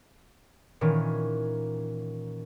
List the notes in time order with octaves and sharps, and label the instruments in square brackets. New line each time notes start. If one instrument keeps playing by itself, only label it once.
[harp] A#2 D#3 E3 C#4